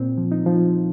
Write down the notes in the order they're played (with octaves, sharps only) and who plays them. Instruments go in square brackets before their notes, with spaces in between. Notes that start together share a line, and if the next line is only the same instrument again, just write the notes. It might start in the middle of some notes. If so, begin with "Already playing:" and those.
Already playing: [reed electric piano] A#2 C4
F3
D#4
F3